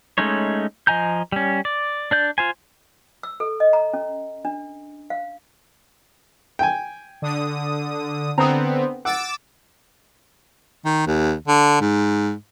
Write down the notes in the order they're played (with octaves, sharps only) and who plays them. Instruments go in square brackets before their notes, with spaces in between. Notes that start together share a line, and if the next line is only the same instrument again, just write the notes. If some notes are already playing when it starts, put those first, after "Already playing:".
[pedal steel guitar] G#3 A3 C#4 D#4 C#5
F3 D#5 G#5 A#5 G6
G3 C#4
D5
D4 D5 G6
F4 C5 G#5
[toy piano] E6
A4
D#5
A#5
C#4
D4
F5
[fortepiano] G5 G#5
[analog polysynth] D3 D#6
[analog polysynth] D3 B3 C4 [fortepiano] A#5 D#6
[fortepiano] F#5 [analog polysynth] D6 E6 A6
[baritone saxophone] D#3
D#2
D3
G#2